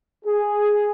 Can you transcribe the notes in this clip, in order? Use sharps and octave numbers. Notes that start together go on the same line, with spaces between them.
G#4